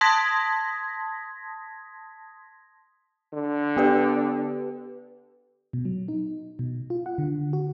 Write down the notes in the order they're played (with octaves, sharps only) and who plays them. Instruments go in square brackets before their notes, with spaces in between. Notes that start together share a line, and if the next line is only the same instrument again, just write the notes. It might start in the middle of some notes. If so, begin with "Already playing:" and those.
[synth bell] A5 C6 D#6 G#6 A#6 B6
[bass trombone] D3
[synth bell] B3 G4 B4
[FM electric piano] B2
F#3
D#4
B2
F4
F#5
D3
F#4